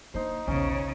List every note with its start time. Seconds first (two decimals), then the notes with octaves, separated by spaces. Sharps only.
0.14 A#3 D4 D#4 C5
0.48 B1 E2 C#3 C#4